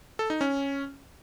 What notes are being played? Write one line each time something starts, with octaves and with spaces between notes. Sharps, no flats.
A4
D#4
C#4